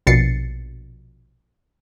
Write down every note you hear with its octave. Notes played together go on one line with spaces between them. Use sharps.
A#1 B2 A6 C7 C#7